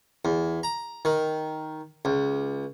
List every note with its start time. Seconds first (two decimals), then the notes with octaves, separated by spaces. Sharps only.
0.25 E2
0.63 A#5
1.05 D#3
2.05 C#2